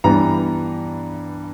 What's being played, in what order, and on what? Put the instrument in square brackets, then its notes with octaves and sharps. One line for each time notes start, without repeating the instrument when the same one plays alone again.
[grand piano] G2 E3 G3 B3 A#5